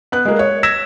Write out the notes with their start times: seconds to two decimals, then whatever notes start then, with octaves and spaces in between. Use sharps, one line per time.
0.12 B3 F#6
0.25 G#3 A#3
0.39 C#5
0.63 E6 G#6 A#6 B6 E7